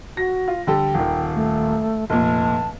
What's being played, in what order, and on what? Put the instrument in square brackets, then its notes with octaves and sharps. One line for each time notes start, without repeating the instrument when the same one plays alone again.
[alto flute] F#4 [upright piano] A#6
[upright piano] F4
[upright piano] D3 G3 A4 [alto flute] G5
[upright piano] D#1 D#3
[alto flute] A3
[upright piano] F1 A#2 [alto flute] A5